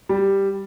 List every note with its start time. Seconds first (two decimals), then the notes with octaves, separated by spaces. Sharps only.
0.09 G3